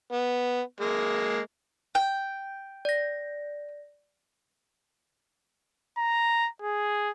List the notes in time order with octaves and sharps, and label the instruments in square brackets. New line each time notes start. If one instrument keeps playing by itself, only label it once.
[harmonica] B3
G#3 A#3
[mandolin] G5
[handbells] D5 A#6
[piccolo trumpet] A#5
G#4